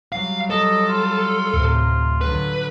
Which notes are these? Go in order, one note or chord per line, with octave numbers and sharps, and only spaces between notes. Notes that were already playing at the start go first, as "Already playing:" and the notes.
F#3 G3 F5
A4 D#5
F4
D2 A2 C3
D3 F#3 B4